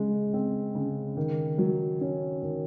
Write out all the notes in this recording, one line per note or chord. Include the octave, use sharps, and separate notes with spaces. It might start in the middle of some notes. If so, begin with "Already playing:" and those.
Already playing: C#3 G#3
C4
C#3
D#3
F#3
C#4
D#3